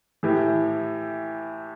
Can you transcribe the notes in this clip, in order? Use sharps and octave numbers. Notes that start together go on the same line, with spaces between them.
A2 E3 G4